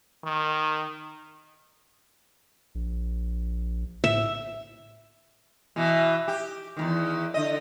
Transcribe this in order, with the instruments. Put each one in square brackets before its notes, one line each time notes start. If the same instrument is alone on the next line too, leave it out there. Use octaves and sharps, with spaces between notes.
[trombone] D#3
[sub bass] A#1
[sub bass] A2 [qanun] E5
[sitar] B2 E3
G4
E2 A#2 D#3
D3 D#5